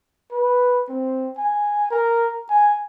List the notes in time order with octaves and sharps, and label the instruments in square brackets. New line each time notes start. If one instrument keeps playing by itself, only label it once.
[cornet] B4
C4
G#5
A#4
G#5